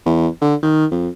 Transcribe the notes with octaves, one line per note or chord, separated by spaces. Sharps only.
E2
D3
D#3
F2